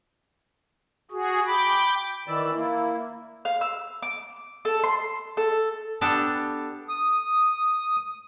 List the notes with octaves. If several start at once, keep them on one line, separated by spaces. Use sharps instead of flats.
F#4 G#4
G5 B5 D6
D#3 E3 D5 B5 E6
A#3 E4
F5
E6
D6
A4
C6
A4
B3 D4 G4 A4 A5
D#6